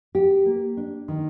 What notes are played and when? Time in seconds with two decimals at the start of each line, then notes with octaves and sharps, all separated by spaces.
0.15 G4
0.46 A#3
0.77 D4
1.08 D#3